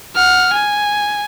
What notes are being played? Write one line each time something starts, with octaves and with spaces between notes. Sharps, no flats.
F#5 F6
G#5